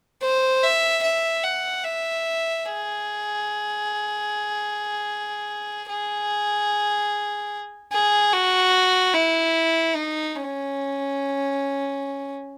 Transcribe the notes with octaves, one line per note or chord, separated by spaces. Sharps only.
C5
E5
E5
F#5
E5
G#4
G#4
G#4
F#4
E4
D#4
C#4